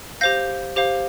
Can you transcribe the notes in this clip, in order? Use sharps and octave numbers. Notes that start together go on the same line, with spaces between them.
G4 C5 F5 G6 A#6
G4 C5 F5